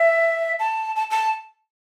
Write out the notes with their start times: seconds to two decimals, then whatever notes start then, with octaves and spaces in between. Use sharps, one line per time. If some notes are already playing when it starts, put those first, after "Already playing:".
Already playing: E5
0.60 A5
0.96 A5
1.11 A5